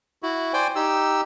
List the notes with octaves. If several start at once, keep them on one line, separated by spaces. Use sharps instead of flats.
E4 F#4
C5 D5 G5 G#5
D#4 G4 E6